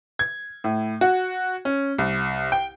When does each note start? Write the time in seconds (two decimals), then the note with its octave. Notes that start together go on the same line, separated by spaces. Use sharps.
0.19 G#6
0.64 A2
1.01 F#4
1.65 C#4
1.98 C2
2.52 G5